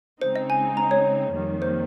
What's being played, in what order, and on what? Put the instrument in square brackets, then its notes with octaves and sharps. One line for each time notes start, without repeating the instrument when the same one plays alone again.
[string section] C#3 G#3 C4 D#4 [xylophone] C5
[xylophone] D#5
G#5
A#5
C#5
[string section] F2 D#3 G3 A#3
[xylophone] C5